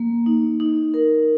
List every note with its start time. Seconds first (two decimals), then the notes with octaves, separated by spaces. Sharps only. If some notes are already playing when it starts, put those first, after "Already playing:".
Already playing: A#3
0.26 D#4
0.60 D#4
0.94 A#4